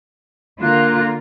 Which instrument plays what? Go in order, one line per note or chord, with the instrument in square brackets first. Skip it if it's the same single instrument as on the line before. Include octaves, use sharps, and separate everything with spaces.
[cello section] D3 F4 A#4 [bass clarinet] A#3 [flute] F#6